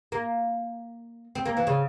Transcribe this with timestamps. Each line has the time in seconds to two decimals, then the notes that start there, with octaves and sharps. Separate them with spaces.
0.12 A#3
1.35 C4
1.46 A#3
1.57 E3
1.67 C#3